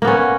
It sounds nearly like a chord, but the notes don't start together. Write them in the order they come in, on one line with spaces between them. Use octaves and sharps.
A#3 B3 C#4